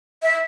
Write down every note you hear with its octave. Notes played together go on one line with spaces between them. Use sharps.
E5